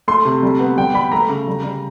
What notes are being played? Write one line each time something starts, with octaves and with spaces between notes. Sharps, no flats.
A3 C6
C3
G3
B3
G3 G5
G3 B5
A3 A#5
C#3
G3
G3